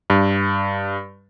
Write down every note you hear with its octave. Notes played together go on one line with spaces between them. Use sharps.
G2